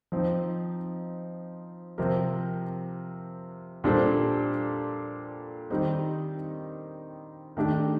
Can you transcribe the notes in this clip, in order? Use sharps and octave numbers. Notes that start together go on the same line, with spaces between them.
F3 C4 D#4
C3 F3 C4 G4 A#4
A#2 G3 D4 A4 C5
D#3 G3 C4 D#4
D#3 A3 D4 G4